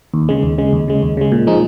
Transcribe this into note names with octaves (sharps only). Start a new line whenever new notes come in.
D#2
C#3 G#3
D#2
C#3 G#3
D#2
C#3 G#3
D#2
C#3 G#3
A#2
F3 G#3 D#4